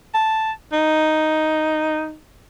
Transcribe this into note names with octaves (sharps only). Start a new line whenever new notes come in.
A5
D#4